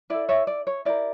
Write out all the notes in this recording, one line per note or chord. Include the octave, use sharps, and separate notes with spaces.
E4 A4 D5
C#5 E5
D5
C#5
E4 G4 A#4 D5